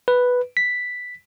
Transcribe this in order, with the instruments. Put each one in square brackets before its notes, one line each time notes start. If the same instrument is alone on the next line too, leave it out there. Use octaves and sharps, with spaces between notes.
[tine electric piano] B4
B6